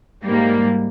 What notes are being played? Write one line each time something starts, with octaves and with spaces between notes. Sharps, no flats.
G#2 G3 A#3